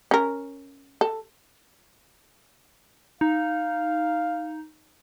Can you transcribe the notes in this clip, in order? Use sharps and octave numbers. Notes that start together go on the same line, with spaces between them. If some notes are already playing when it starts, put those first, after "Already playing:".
C#4 A#4
A4
D#4 F5